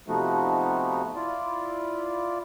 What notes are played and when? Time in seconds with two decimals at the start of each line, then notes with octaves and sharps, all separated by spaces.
0.08 C3 F3 A3 B3 D#4 F#4
1.16 E4 F4 D5